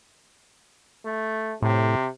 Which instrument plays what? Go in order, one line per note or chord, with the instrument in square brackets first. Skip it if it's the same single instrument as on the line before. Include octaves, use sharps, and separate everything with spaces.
[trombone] A3
[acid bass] A2 [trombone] C3